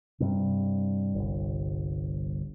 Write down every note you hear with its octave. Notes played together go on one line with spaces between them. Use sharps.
G2 C3
G1 C2